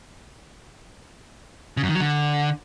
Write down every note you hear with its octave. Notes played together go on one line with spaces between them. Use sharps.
C#3
F#2
D#3
F#3
D3